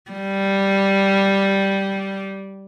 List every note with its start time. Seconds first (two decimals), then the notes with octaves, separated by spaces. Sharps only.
0.11 G3